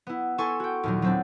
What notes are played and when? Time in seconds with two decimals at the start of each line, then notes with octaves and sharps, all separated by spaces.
0.07 B3 E4
0.38 E4 A4 G#5 C6 C#6
0.60 F#4 G5
0.83 D#2 A#2 F#3
1.02 F#3 C4 D4